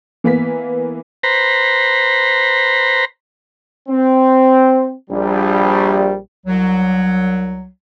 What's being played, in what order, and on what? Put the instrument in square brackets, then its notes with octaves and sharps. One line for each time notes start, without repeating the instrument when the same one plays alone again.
[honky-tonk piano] E3 A#3 B3 B6
[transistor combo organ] B4 C5 A#5
[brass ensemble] C4
A#1 G3
[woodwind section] C2 F#3